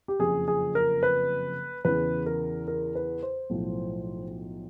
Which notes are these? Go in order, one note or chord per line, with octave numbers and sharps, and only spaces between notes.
G4
F#1 F2 C#3 F3 G#4
G#4
A#4
B4
E2 C#3 E3 B4
A#4
A#4
B4
C5
B1 A2 F3